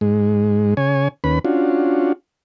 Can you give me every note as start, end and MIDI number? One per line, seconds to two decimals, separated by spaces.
0.01 0.74 44
0.01 0.74 56
0.77 1.08 49
0.77 1.08 73
0.77 1.08 80
1.24 1.39 39
1.24 1.39 61
1.24 1.39 71
1.24 1.39 83
1.45 2.12 61
1.45 2.12 62
1.45 2.12 65
1.45 2.12 66